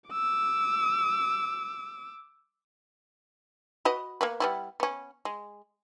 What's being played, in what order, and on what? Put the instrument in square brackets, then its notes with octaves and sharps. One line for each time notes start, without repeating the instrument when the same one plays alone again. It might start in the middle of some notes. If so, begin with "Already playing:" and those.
[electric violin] D6 E6
[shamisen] F#4 B4 D#5
A#3 B3 B4
G3 B3 E4
B3 C#4
G#3